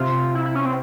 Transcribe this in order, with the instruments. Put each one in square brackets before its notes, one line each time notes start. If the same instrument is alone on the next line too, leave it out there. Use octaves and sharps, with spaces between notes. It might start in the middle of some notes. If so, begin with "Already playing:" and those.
Already playing: [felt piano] C3 [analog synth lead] F4
[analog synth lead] E4
E4
C#4
C4